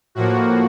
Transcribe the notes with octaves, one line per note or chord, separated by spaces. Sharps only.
A2 F3 A#3 F#4